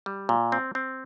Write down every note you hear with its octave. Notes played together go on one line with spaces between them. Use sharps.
G3
A#2
C4
C4